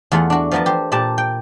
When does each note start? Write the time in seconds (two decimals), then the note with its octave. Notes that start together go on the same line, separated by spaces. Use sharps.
0.12 E2 A3 F4 G#4 F#5
0.30 D4 F#4
0.51 F3 A3 B3 A#4 A5
0.66 G4 C5
0.92 A#2 G4 A5
1.18 G5